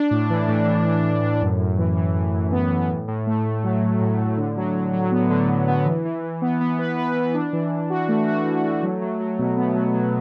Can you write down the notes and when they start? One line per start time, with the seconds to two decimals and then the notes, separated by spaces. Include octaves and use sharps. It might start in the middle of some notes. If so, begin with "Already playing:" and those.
Already playing: D4
0.11 A2
0.30 E3
0.48 A2
0.67 E3
0.86 A2
1.04 E3
1.23 A2
1.42 F#2
1.59 F#2
1.78 E3
1.97 E3
2.15 F#2
2.34 F#2
2.52 B3
2.71 E3
2.90 A2
3.08 A2
3.27 A3
3.46 A2
3.64 F#3
3.82 A2
4.00 A2
4.19 A2
4.37 D3
4.57 F#3
4.74 F#3
4.93 F#3
5.12 B3
5.30 D3
5.50 D3
5.68 B3
5.86 E3
6.05 E3
6.23 E3
6.42 B3
6.61 B3
6.79 B4
6.98 B4
7.16 E3
7.34 D4
7.53 E3
7.71 D4
7.90 F#4
8.08 A3
8.28 F#4
8.46 E3
8.64 A3
8.83 F#3
9.02 F#3
9.20 F#3
9.39 B2
9.57 B3
9.75 F#3
9.94 F#3